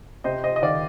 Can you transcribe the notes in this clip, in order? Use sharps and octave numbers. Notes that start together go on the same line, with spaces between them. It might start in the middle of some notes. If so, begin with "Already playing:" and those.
C3 C5 D#5
C5 D#5
D#5
D#3 D5 F5